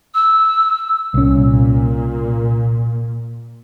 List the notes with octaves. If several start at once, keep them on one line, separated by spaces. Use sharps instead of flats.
E6
C2 A#2 C#4